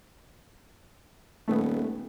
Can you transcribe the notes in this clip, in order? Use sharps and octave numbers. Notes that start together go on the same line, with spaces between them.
D#1 A3 B3